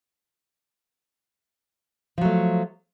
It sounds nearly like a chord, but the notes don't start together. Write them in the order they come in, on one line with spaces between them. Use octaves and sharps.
F3 F#3 A3